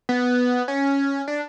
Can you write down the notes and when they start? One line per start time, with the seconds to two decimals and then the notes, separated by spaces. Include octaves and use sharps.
0.09 B3
0.68 C#4
1.28 D4